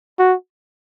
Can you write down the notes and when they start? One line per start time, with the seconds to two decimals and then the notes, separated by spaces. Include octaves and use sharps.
0.19 F#4